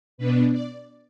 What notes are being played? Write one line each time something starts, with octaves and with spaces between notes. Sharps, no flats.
B2 B3 D4 B4
D5